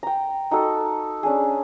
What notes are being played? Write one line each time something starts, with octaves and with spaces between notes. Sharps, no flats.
G5 A#5
D#4 F#4 A4
C#4 D4 G#4